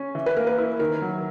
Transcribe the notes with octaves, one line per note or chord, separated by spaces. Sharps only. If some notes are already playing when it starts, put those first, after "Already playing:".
Already playing: C#4
E3
B4
A#3 A#4
B4
E4
D#3 A#4
F#3